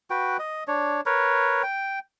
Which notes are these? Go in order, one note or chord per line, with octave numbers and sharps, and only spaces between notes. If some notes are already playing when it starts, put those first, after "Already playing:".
F#4 B4 G5
D#5
D4 C#5
A#4 B4 C#5
G5